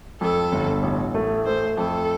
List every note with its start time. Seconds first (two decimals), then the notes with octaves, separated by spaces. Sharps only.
0.21 F2 A4
0.52 G1
0.83 A1
1.14 A3
1.46 A3 C5
1.78 F2 A4